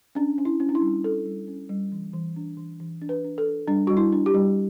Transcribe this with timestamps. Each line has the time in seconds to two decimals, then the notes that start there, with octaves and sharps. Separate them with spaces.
0.15 C#4 D4
0.38 C#4
0.45 E4
0.60 C#4
0.69 D4
0.75 E4
0.81 G3
1.04 C#4 A4
1.25 G3
1.48 C#4
1.69 G3
1.92 E3
2.14 E3
2.36 D4
2.57 E3
2.80 E3
3.02 D4
3.09 B4
3.24 D4
3.38 A4
3.46 D4
3.68 G3 D4
3.87 G3 F#4
3.97 E4
4.12 D4
4.26 G4
4.34 G3